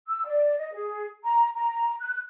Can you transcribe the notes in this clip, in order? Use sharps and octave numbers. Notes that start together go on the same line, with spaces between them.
E6
D5
D#5
G#4
A#5
A#5
F#6